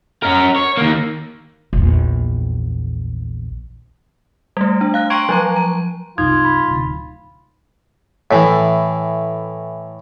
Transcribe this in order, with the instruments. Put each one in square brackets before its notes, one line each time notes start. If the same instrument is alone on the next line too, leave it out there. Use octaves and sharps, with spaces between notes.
[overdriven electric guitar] C#4 A#4
C#5
D#3 A#3
[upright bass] A#1 E2
[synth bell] G3 A3
D4
F5 F#6
G5 A#5 C6 C#6 G#6 D7
F3 F#3 A#5
A#5
[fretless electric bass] C2 F#2 [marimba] D#4 [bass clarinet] F4 [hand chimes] G#6
[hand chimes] B5
[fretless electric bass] D1 D2 C3
[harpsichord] A2 E3